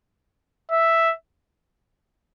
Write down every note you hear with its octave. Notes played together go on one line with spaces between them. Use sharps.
E5